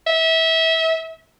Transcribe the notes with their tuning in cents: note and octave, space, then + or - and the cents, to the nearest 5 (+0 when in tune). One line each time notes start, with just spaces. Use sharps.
E5 -25